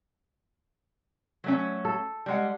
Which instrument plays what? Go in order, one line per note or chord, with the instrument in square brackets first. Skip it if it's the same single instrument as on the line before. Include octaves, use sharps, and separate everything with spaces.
[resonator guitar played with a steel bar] F#3 A3 C#4
[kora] A4
[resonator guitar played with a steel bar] G3 G#3 F#5